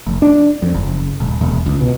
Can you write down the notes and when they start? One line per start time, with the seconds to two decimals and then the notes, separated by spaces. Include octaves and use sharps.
0.07 F1
0.22 D4
0.62 F2
0.75 F#1
1.20 D#1
1.41 E1
1.66 C#2
1.81 B2